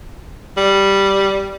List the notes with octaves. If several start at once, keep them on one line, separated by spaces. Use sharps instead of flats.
G3